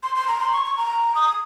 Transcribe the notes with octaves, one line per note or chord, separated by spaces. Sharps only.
C6
C6
A#5
C6
C#6
C#6
A#5
D#6